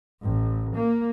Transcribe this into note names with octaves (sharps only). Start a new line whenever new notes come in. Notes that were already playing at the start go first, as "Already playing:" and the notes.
A1
A#3